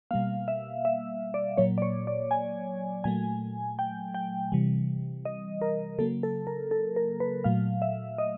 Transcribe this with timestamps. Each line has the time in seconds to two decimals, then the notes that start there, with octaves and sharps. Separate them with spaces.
0.11 B2 G3 A#3 F5
0.48 E5
0.85 E5
1.34 D5
1.57 A#2 F#3 A#3 C#5
1.78 D5
1.82 C#5
2.07 D5
2.31 G#5
3.04 A#2 F#3 A3 G#5
3.79 G5
4.14 G5
4.52 C3 E3 G3
5.25 D#5
5.62 A#4
5.98 C#3 F#3 A#3 A4
6.23 A4
6.47 A#4
6.71 A4
6.96 A#4
7.20 B4
7.44 A#2 F#3 A3 F5
7.82 E5
8.18 D#5